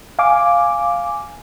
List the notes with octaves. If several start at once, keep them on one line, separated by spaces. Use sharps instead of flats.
F5 G#5 D6